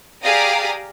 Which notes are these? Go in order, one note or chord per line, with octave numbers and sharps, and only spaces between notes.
G4 G#4 D5 F5 A#5 D#6